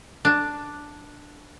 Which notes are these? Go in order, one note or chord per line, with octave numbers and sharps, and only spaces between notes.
D4